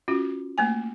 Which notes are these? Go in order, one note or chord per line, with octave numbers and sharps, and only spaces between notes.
C#4 F4 F#4
A3 A#3 G#5